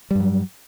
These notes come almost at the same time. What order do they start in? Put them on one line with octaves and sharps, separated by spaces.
G3 G2 F#3